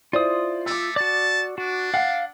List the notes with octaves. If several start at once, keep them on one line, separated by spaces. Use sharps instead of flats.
E4 F4 C5 D5 D#6
A3 D6 E6
F#4 D5 A5
D4 F#4
F5 F#5